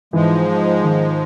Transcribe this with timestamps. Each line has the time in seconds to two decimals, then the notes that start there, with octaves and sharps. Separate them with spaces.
0.13 G#2 E3 F3 G#3
0.83 D#3